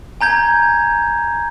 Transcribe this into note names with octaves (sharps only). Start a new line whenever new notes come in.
G#5 A#5 G6 G#6